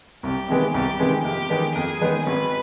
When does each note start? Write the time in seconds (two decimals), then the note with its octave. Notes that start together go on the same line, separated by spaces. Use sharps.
0.23 C2 G4
0.49 C3 D#3 G#3 B3
0.74 C2 G4
0.99 C3 D#3 G#3 B3
1.24 F2 G4
1.50 D#3 G#3 B3 D#4
1.75 F2 G#4
2.01 D#3 G#3 B3 D#4
2.26 G#1 B4